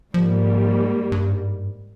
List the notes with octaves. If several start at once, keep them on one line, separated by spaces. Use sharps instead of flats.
G#2 F3 G3 A#3
G2